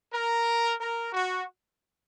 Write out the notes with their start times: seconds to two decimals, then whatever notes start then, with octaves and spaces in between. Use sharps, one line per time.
0.12 A#4
0.80 A#4
1.13 F#4